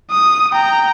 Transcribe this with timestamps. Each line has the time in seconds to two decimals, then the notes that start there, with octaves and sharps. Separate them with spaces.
0.11 D#6
0.53 G5 A#5